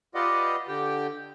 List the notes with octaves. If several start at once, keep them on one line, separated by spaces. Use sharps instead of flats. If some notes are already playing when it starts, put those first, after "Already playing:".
F4 G4 B4 D5 D#5 F#5
D3 G4 G5